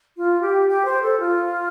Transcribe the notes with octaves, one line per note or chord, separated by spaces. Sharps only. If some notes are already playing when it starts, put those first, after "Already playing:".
F4
G4
G4
C5
A4
F4